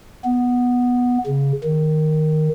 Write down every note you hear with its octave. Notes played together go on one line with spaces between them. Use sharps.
B3
C#3
D#3